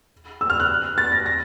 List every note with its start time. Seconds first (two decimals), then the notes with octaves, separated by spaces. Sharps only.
0.41 E6
0.50 F6
0.60 F#6
0.98 A6
1.12 A#6
1.26 A#6